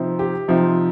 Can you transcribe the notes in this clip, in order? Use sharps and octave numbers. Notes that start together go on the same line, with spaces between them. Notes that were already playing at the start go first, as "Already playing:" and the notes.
Already playing: C3 F3 C4 D#4
G4
C3 F3 C4 D#4